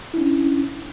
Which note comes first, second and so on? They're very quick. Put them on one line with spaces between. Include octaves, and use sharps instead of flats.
E4 D4 C#4